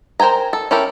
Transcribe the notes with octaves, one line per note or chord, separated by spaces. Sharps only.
A#4 C5 G5 G#5 A#5
A4
C#4 E4 G4 A4 A#4